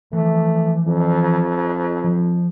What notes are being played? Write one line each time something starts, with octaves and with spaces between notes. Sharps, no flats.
E3 F3 A3
F2
F3